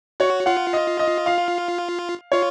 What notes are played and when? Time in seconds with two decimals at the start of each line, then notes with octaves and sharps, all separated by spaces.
0.20 F#4 C#5
0.46 F4 F#5
0.73 D#5
0.99 D#5
1.26 F5
2.32 F4 C#5